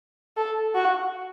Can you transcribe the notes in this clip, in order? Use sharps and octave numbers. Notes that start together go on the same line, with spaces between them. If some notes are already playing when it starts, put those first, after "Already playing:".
A4
F#4